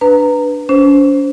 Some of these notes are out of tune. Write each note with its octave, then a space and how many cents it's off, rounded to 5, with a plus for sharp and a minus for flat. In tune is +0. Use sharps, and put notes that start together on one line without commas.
D4 +0 B4 +0 A#5 -20
C#4 +40 C5 +0